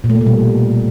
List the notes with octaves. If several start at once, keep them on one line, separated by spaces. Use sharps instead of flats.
A#2
A3
A#3
B2
G3